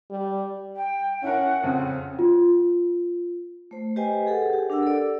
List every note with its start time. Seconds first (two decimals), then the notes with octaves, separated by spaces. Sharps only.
0.10 G3
0.76 G5
1.23 C#4 E4 A#4 F#5
1.63 F2 C#3 C4
2.19 F4
3.71 A3 C5
3.96 G4 B4 C5 D#5 G5 G#5
4.27 G#4 A4 F#5
4.53 G4
4.70 D4 A#4 F#5 E6
4.83 A4 D5